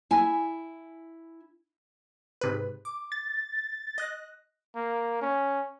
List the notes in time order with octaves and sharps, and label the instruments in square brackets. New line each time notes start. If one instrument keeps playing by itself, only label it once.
[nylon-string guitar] E4 G#5
[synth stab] G#2 C3 B4
D6
[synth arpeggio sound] A6
[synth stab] D#5 F#6 A#6
[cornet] A#3
C#4